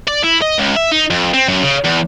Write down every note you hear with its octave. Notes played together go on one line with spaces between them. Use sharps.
D5
E4
D#5
C#2
E5
D#4
F2
C4
F#2
C#3
E2